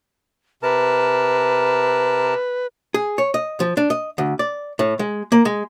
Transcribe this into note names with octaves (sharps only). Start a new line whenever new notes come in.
C3 A#4 B4 A5
G#4
C#5
D#5
F3
D4
D#5
D2
D5
A2
G#3
A#3
G#3